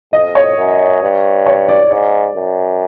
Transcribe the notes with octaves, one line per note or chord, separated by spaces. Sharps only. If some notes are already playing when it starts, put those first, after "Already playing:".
F2 D#5
C#5
F#2
G2
C#5
D5
G#2 D5
F#2